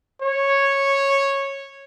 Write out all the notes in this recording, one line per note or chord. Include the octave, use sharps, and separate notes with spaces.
C#5